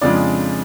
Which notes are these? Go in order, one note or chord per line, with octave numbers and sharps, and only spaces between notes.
F2 C#3 F3 G#3 D4 D5